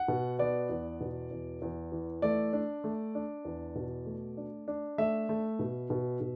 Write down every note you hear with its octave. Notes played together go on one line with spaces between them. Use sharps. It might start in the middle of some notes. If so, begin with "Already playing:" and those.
Already playing: F#5
B2
B3 D5
E2
B2
E2
E2
E3
A3 D5
D4
A3
D4
E2
B2
A3
D4
D4
A3 E5
A3
B2
B2
B2